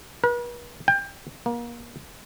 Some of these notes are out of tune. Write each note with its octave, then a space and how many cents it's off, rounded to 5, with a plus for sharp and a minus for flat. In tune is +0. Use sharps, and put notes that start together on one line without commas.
B4 -45
G5 +25
A#3 +30